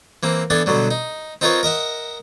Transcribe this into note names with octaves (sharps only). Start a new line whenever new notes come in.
E3 A#3 C4
E3 B3 D4 A4 G#5
B2 D3 F#3 G3
D#4
C4 D#4 F4 A#4 B4 C#5
A#4 D#5 E5 F#5